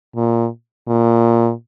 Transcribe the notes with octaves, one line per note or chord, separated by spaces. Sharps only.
A#2
A#2